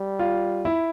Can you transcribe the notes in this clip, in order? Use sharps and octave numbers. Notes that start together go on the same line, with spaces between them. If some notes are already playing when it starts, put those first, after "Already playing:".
Already playing: G3
F4
E4